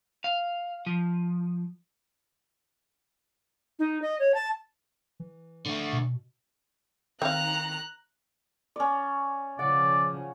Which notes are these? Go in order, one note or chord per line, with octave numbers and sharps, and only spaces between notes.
F5
F3
D#4
D#5
C#5
A5
E3
D3 A3
B2
D#3 C4 F5 A#5 F#6
C#4 D5
C#3 F3 D5 F#5